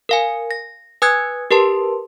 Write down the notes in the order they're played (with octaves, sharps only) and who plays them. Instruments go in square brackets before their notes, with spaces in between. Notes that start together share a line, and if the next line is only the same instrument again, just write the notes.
[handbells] A#4 F5 G#5
A#6
B4 G#5 D#6 E6 F#6 G#6
G4 A#4 B4 A5 C6